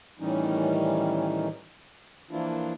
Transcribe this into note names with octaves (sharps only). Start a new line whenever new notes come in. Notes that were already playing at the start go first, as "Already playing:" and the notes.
A2 D#3 E3 G3 C#4 D#4
E3 F3 A#3 D4 E4 F4